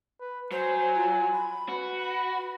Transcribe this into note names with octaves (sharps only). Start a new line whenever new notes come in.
B4
F#3 C5 G#5
F4
B5
F#4 B4
B5